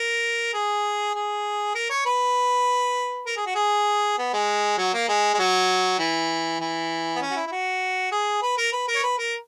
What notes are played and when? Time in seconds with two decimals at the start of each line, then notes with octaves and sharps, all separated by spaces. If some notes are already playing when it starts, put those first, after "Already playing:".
Already playing: A#4
0.53 G#4
1.15 G#4
1.75 A#4
1.90 C#5
2.06 B4
3.26 A#4
3.37 G#4
3.47 F#4
3.55 G#4
4.18 B3
4.33 G#3
4.78 F#3
4.94 A#3
5.09 G#3
5.34 G#3
5.39 F#3
5.99 E3
6.60 E3
7.16 B3
7.22 C#4
7.31 F#4
7.36 E4
7.47 E4
7.52 F#4
8.12 G#4
8.42 B4
8.58 A#4
8.72 B4
8.88 A#4
8.96 C#5
9.03 B4
9.19 A#4